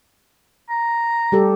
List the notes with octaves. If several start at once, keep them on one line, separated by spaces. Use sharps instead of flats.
A#5
G3 G4 A4